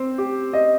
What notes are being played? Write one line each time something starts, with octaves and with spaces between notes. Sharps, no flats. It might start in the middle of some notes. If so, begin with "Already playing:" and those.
Already playing: C4 C5
G4
D#5